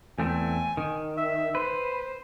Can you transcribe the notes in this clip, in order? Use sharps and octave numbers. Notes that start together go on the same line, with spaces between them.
E2 A3 C4 G#5
D#3
E5
B4 C5